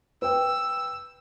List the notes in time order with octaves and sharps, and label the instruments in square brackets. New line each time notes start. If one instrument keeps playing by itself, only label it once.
[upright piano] B4 G5 [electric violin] E6